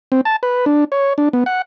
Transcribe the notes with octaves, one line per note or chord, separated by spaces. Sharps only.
C4
A5
B4
D4
C#5
D4
B3
F#5